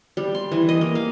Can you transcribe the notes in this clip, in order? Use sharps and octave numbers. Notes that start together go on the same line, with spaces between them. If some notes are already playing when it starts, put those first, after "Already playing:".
G3
C6
E3
D#5
A#3
F5